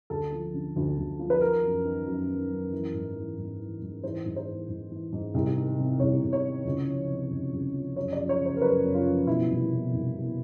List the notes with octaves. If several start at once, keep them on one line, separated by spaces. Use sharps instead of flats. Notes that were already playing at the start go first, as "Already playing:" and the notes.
D2 A4
F3
D3
D2
D2
F3
B4
D#3 A#4
F#2
D#3
F#2
D#3
F#2
E3
G#2
E3
G#2
E3
G#2
E3 C5
G#2
C5
E3
G#2
E3
G#2
C2
D#3
C3
C2 C#5
C2
C#5
D#3
C#2
F3
C3
C#2
C#2
F3
F#2 C#5
D5
F3
C#5
C#3
C5
A#4
F#2 B4
F#2
F4
F3
B2 E4
C2
B2
C2
B2